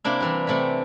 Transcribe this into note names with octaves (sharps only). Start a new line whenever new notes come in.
C3 A#3 D4 E4
C3 E3 G3
C3 A3 E4 B5